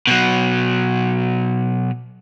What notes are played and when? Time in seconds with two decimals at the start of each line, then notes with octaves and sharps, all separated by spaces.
0.07 B2 F#3